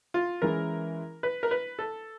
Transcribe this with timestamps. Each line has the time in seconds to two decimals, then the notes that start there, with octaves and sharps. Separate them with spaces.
0.14 F4
0.42 E3 G#3 C#4 E4 A#4
1.23 B4
1.43 A#4
1.51 B4
1.79 A4